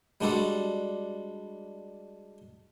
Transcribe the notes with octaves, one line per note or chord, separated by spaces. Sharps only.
G3 G#3 D4 F#4 A4